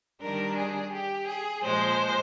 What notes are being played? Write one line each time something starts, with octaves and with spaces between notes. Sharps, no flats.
D#3 G3 D4 A#4
G#4
G4
G#4
A#2 F3 G#3 C5